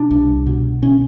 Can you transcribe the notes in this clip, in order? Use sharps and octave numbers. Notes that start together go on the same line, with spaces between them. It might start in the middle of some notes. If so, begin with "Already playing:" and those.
Already playing: B2 D4
C2
B2
B2 C#4